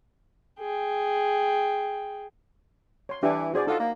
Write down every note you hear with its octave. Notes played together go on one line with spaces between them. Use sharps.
G#4 G5
C#5 C6
E3 D4 E4 G4
B2 F#4 G#4 C5 D5
D#4 F4 A4 D#5 F#5
A#3